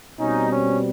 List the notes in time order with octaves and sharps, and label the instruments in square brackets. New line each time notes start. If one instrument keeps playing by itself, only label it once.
[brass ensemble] B2 G3 C4 C#4 D#4
C#4